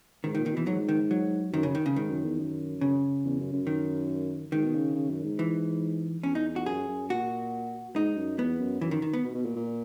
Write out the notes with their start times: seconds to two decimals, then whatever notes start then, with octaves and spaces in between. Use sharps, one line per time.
0.24 G#2 D#3
0.35 D#3
0.38 A#2
0.46 D#3
0.53 B2 E3
0.67 G#2 F#3
0.89 D#3
1.11 F#3
1.53 F#2 D#3
1.63 C#3
1.75 D#3
1.86 C#3
1.96 G#2 D#3
2.10 F#2
2.25 E2
2.39 F#2
2.81 C#3
3.24 E2
3.39 F#2
3.53 F#2
3.67 D#3
4.52 G#2 D#3
4.64 B2
4.75 C#3
4.95 C#3
5.10 F#2
5.24 G#2
5.39 E3
6.23 E2 C#4
6.35 D#4
6.56 F#4
6.66 F#2 G#4
6.88 F#2
7.10 A#2 F#4
7.95 G#2 D#4
8.17 F#2
8.38 E2 B3
8.60 F#2
8.81 F#2 E3
8.91 D#3
9.02 D#3
9.13 B3
9.24 B2
9.35 B2
9.45 A#2
9.56 A#2